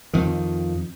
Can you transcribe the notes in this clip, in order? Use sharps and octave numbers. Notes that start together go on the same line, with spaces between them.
F2 D#3